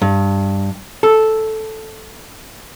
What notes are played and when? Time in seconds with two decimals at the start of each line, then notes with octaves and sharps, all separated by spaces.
0.02 G2
1.03 A4